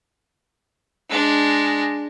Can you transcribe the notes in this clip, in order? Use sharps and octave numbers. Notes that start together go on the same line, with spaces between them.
G#3 D4